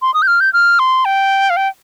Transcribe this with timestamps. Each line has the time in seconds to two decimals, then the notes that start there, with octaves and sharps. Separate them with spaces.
0.02 C6
0.14 D#6
0.22 G6
0.27 F6
0.40 G6
0.53 F6
0.79 C6
1.05 G5
1.50 F5
1.57 G5